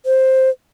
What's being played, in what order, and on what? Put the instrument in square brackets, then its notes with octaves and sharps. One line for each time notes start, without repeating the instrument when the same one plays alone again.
[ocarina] C5